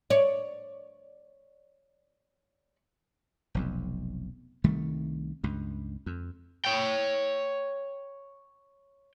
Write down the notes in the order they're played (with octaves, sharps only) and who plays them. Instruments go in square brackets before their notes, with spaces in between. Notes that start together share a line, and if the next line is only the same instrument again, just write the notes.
[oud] C#5 D5
[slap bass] F1 B1 F2
C2 D#3 G3 A3
C#2 G2
F2
[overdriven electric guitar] C#5 G5